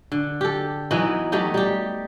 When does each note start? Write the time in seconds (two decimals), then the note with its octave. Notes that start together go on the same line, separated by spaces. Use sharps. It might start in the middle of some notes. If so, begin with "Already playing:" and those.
0.12 D3
0.41 G4 A4
0.91 E3 F#3 B3 D#4
1.32 F#3 A3 D#4 G4
1.54 G3 G4